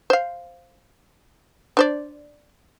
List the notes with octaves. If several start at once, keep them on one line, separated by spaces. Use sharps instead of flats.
C5 F5
D4 C5 D5